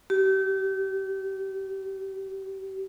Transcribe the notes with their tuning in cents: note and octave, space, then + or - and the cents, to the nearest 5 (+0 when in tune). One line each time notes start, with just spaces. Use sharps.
G4 -30